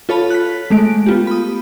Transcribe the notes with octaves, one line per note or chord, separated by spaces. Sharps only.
F4 A4 C#5 F5 A5 B5
F#6 B6
G#3 A3 D7
B3 F4 G4
B5 D#6